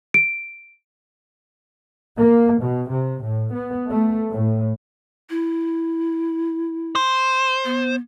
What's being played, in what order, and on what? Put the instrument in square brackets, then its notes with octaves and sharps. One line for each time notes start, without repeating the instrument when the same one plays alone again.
[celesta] D7
[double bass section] A#3
B2
C3
A2
B3
A3
A2
[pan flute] E4
[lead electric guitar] C5
[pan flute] B3